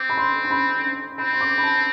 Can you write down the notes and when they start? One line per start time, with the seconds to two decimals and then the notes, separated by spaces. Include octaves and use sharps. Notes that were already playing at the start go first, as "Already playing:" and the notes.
Already playing: C4 D6
0.10 B5
0.17 C6
0.45 C6
0.51 B5
1.18 C4 B5
1.33 C6
1.41 D6
1.58 B5
1.63 A5